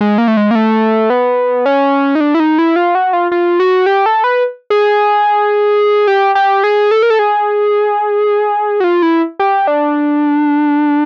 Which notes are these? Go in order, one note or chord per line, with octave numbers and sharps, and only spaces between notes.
G#3
A#3
A3
G#3
A#3
A3
B3
C#4
D#4
D4
E4
D#4
E4
F4
F#4
F4
F4
F#4
G4
A4
B4
G#4
G4
G4
G#4
A4
A#4
A4
G#4
F#4
F4
E4
G4
D4